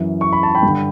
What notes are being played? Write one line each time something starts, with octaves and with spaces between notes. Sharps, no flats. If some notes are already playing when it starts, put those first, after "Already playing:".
Already playing: F#2 E3
C#6
B5
A5
G5 B5
G2 D3